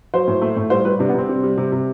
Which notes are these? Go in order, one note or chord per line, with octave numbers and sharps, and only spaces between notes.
F#3 C5
A2
A3
A2
G3 C5
G3 B4
C3 D4
B3
C3 C4
G3
G3
C3
C3